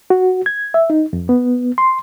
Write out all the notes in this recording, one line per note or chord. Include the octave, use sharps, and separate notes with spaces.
F#4
G#6
E5
D#4
F2
B3
C6